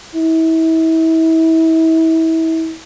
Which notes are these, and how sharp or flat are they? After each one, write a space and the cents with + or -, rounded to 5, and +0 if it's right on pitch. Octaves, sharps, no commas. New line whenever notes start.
E4 -30